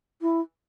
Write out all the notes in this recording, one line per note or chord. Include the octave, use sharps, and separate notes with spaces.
E4